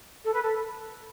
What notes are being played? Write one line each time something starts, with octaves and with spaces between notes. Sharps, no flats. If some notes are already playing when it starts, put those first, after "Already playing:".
A4
B4
A4